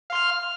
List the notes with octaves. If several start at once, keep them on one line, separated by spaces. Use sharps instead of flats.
F5 C6 F6